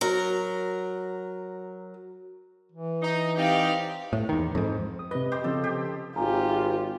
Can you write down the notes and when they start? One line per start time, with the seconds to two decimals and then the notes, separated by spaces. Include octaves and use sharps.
0.01 F#3 A#4
2.72 E3
3.03 D#4
3.36 C4 D#4 G4 D5 F5
4.13 A2
4.29 E2 D#3
4.55 F2 G#2
4.99 D#6
5.11 C3 B4 D#5
5.32 G4 C5
5.44 C#3 F3 C4 A4
5.64 G4
6.16 G#1 F4 G4 G#5 A#5